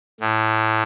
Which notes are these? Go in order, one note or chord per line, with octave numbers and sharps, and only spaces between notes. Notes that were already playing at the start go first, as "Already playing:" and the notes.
A2